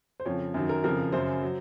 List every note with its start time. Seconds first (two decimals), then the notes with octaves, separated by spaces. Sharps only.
0.20 C5
0.25 F2 C#3 F3 C#5
0.54 F#2 D#3 F#3
0.69 A#4
0.84 F2 C#3 F3 A#4
1.12 F#2 C#3 F#3 C5
1.42 F#3